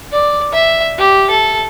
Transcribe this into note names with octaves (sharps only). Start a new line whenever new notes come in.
D5
E5
G4
A4